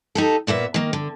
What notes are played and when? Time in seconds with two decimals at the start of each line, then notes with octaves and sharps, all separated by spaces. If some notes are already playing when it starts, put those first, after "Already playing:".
0.15 D#4 G4 A4
0.47 A#2 A#3 B3 E5
0.74 D#3 A#3
0.93 D3